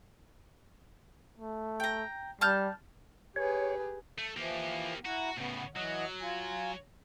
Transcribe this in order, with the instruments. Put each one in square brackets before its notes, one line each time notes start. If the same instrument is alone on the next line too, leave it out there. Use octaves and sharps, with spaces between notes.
[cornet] A3
[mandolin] G5 A#5
[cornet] G3 [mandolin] A5 F6 G6
[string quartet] G4 G#4 B4 [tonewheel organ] C#5
[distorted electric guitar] A3
[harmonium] E3 F3 [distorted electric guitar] A#3 G4
[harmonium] E4 F#5 A#5 [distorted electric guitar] F#4
[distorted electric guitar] A2 C#3 [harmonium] B3
[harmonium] E3 D#5 F#5 [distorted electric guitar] F#3
[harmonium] F4 G#5